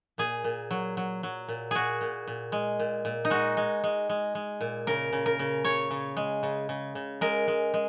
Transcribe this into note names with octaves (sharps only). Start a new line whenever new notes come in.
A#2 G#4
A#2
F#3
F#3
F#3
A#2
A#2 F#4 G#4
A#2
A#2
G#3
A#2
A#2
D#4
G#3 F#4
G#3
G#3
G#3
G#3
A#2
C#3 A#4
C#3
A#4
C#3
C#3 C#5
C#3
G#3
C#3
C#3
C#3
G#3 A#4
G#3
G#3